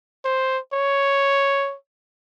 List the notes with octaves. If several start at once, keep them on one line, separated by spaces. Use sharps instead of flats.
C5
C#5